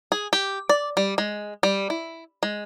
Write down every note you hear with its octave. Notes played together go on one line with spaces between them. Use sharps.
G#4
G4
D5
G3
G#3
G3
E4
G#3